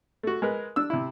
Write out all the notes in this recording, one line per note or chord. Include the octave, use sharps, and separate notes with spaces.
A3 F#4
G#3 A#4 B4
D4 E6
C3 E4